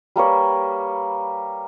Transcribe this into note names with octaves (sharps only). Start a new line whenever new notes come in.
G3 A#3 B4 C#5